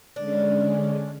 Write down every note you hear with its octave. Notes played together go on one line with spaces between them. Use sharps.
D3 G#3 C#4 D4